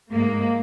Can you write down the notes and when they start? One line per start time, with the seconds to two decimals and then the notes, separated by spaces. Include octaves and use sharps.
0.12 G#2 G#3 A#3